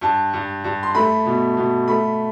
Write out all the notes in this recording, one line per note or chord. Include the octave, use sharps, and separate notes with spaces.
G2 A5
G2
G2
C6
A3 B5
B2
B2
A3 B5